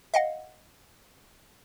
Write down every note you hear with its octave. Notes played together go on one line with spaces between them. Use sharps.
D#5 F5 F#5